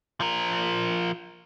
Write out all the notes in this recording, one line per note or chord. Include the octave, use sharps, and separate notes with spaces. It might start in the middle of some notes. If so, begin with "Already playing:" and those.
F3 A#4